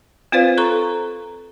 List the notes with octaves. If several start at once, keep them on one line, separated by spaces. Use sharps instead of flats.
C4 F4 B4 C5 D5 F5
A4 A#5 C#6